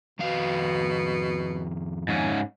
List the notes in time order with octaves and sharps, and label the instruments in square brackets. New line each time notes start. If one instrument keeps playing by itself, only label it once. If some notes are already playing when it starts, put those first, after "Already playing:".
[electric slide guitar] F2 D#3 F5 [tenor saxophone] B2
[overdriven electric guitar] G#2 C#4